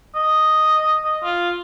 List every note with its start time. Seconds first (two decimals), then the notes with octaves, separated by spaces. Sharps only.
0.15 D#5
1.05 D#5
1.24 F4